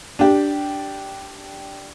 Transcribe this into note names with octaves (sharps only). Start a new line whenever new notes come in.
D4 G4